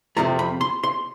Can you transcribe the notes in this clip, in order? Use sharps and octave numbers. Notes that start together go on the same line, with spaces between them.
F2 C3 F3 A3 A#5
B5
C6
C6